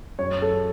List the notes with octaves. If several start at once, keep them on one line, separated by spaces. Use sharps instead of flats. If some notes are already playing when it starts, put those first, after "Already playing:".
F#2 C#5
A4